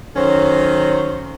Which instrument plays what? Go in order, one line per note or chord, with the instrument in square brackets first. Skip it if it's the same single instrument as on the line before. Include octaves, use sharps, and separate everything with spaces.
[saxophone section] D#3 F#3 C#4 A4 C5